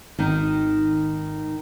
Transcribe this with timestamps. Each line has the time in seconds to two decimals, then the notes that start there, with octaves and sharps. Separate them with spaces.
0.19 G#1 D#3 D#4